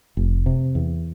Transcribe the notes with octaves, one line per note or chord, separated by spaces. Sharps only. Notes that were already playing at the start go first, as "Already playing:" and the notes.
F1
C3
E2